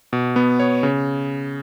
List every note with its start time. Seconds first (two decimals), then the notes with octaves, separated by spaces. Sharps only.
0.13 B2
0.36 B3
0.60 C#5
0.83 C#3